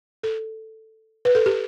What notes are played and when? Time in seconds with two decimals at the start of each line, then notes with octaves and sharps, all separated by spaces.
0.23 A4
1.25 B4
1.35 A4
1.46 G4